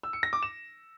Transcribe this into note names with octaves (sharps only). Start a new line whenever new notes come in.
E6
C#7
A#6
D6
E7